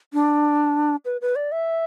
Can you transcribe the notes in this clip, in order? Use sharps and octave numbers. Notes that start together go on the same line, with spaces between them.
D4
B4
B4
D5
E5